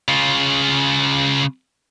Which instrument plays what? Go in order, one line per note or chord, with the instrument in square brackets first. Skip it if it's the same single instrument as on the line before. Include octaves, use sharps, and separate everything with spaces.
[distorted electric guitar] C#3 F4